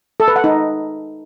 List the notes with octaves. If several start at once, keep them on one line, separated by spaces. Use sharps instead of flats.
A4
B4
F#5
D#4